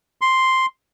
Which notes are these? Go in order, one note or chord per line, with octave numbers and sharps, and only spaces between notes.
C6